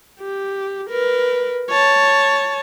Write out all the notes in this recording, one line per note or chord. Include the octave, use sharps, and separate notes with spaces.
G4
A#4 B4
C#5 A5